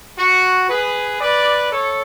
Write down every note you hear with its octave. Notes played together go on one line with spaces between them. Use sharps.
F#4
G#4 B4
B4 D5
A4 C#5